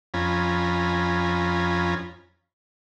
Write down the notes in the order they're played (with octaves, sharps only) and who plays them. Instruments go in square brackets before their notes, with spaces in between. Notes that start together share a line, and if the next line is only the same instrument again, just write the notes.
[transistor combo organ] F2 C#4 F4 G#5 A#5 B5